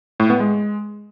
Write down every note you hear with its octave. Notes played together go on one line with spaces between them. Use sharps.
A2
B3
G#3